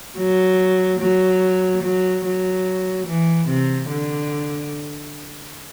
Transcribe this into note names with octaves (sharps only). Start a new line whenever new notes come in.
F#3
F#3
F#3
F#3
E3
C3
D3